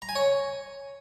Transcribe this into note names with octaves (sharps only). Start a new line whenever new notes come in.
A#5
G#5
C#5